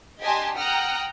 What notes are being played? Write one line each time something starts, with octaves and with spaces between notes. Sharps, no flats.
D4 G4 D#5 G#5 A5 C6
F#5 G5 A#5 D#6 F6 F#6